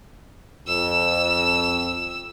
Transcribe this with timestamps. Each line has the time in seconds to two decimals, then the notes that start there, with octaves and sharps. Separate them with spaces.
0.68 F2 E6